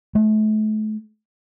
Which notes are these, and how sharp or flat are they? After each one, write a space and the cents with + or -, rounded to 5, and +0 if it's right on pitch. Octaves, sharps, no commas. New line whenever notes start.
A3 -35